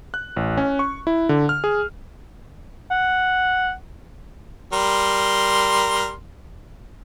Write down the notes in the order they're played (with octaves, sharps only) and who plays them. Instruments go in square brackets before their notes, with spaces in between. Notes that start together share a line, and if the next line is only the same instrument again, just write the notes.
[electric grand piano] F#6
A1
C#4
C#6
E4
D3
F6
G#4
[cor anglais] F#5
[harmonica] G3 A#4 C6